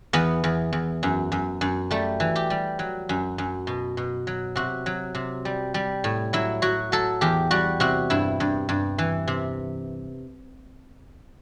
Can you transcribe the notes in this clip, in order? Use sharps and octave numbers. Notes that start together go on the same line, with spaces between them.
E2 B3
E2
E2
F#2
F#2
F#2
G3 A3
E3
G4
G3
F#3
F#2
F#2
B2
B2
F#3
C3 F#4
F#3
C3
G3
G3
A2
F#3 E4
F#3 F#4
F#3 A4
E2 G4
G3 F#4
C3 F#4
G2 E4
G2
G2
E3
C3